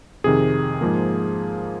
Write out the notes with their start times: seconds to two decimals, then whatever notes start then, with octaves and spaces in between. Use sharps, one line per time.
0.24 F2 C3 D#3 G#4
0.81 G#2 F3 A#3